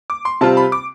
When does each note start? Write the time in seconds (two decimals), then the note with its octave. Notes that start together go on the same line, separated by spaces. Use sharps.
0.10 D6
0.25 C6
0.41 C3 G3 C4 F4 A5
0.57 B5
0.72 D6